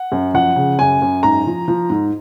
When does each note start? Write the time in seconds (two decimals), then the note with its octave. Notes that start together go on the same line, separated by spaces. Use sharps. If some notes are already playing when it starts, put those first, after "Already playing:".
Already playing: F#5
0.12 F#2
0.34 F3 F#5
0.56 C#3
0.79 F#2 G#5
1.02 F#2
1.23 G#2 A#5
1.46 F3
1.68 F3
1.90 G#2